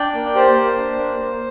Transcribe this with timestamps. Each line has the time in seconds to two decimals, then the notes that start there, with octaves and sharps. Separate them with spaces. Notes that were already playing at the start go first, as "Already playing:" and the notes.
Already playing: D4 D5 G5
0.14 A#3
0.35 G4 C5
0.56 A#3
0.78 D4
0.98 A#3
1.20 A#3